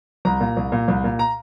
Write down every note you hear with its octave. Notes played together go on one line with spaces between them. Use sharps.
C2 A#5
A#2
C2
A#2
C2
A#2
A#5